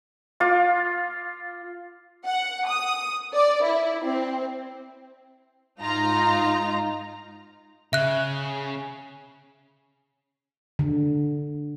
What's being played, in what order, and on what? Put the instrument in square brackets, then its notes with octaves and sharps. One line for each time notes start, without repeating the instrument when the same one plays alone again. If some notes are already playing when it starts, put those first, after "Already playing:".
[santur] F4 D6
[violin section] F#5
D#6
D5
E4
C4
[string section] G#2 D#4 F4 A#5
[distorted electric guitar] C#3 [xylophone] E5 F#6
[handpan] D3